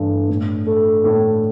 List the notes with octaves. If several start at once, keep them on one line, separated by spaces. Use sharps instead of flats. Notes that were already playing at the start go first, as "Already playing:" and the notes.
Already playing: G2 E3 A3
A2
A3
A2